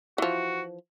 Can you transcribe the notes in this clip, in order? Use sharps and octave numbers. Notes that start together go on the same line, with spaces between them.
E3 F3 F#4